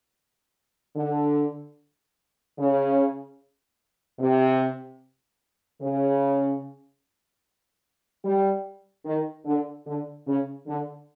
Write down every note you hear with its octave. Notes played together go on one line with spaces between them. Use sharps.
D3
C#3
C3
C#3
G3
D#3
D3
D3
C#3
D3